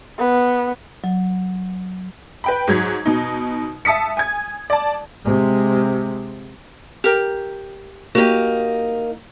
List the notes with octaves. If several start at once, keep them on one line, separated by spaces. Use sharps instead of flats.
B3
F#3
B4 G5 B5
G#2 F#3 G#6
B2 D#4
E5 A5 D#6 B6 C#7
G#5 G#6
D5 A5
C3 G#3
G4 A#4
A#3 D#4 F#4 G4